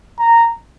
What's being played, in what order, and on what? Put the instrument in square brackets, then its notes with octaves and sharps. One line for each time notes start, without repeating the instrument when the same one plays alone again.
[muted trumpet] A#5